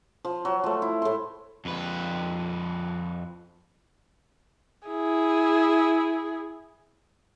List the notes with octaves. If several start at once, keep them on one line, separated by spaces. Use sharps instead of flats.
F3
F#3
F3 A3
E4
A2 C6
F2 B4
E4 G#4